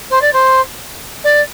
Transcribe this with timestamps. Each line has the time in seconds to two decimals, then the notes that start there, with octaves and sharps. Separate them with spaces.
0.10 C5
0.22 D5
0.33 C5
1.24 D5